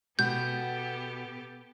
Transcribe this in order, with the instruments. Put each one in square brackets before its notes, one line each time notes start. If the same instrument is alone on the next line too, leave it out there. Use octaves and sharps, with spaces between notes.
[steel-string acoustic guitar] B2 F#4 [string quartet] B3 G4 A4 [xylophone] G6